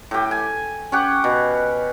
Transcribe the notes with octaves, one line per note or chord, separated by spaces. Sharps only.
A2 G4
G#5
C#4 G4 F#5
B2